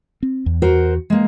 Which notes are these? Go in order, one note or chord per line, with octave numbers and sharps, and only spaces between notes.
C4
E2
F#4 A#4 C5
G#3 A#3